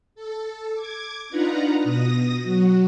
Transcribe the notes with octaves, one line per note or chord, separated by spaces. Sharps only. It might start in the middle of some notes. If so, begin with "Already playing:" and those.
A4
D6 G#6
D4 D#4 F4 B4 F#5 A#5
B2 D#6 A#6
F#3 F#4